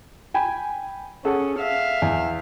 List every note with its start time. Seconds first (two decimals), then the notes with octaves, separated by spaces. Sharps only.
0.34 G5 G#5 B5
1.25 C#4 G#4 A4 F#5
1.59 E5 F5
2.02 E2